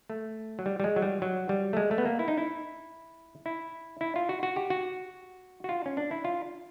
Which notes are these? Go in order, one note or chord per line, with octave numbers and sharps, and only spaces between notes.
A3
F#3
G3
G3
G#3
F#3
G3
F#3
G3
A3
G#3
A3
B3
A#3
E4
D#4
E4
E4
E4
F4
F#4
F#4
G4
F#4
F#4
F4
C#4
D4
E4
F4